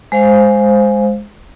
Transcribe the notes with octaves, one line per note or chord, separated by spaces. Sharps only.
G#3 C5 F5